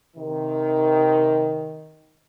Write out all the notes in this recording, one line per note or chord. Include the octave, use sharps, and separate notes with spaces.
C3 D#3